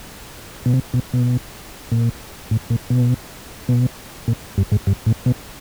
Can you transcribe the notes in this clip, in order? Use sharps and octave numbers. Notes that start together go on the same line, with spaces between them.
B2
C3
B2
B2
A#2
A2
A#2
B2
B2
A#2
G2
G#2
G2
A2
B2